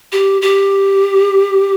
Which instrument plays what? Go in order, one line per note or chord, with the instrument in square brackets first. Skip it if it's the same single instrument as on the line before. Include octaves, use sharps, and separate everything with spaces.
[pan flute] G4
G4